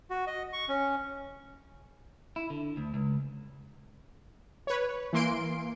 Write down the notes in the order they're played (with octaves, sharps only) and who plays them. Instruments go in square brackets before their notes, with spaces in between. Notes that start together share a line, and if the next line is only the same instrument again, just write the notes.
[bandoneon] F#4
D#5
C#6
C#4
[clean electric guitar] E4
D3
D2
C#2
[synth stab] B4 C#5
E3 A#3 C6 D7